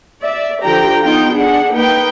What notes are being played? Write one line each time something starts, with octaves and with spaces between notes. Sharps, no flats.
D5 E5
D3 F3 G4 G5 A#5
B3 D#4 F4 G5
D4 G#4 F#5
A#3 D#4 B4 G5